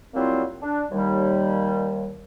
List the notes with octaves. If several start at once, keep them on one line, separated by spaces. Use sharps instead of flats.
F#3 G3 A#3 C4 E4 F4
D4
D#2 G3